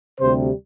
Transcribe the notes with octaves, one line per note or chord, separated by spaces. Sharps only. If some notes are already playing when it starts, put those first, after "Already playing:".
D2 C3 G3 C5